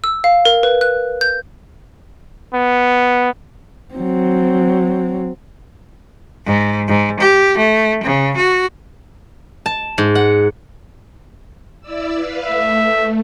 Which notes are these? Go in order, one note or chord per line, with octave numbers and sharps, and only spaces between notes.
E6
F5
A#4
B4
F#6
G6
B3
F#3 C4
G#2
G#2
G4
A3
C#3
F#4
A5
G#2
F#5
E4 D5 E6
B4 F5
A3 E5